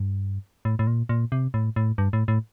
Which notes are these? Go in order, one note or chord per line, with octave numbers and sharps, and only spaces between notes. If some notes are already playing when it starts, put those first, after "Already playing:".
Already playing: G2
A2
A2
A#2
A#2
C3
A2
A2
G2
A2
A2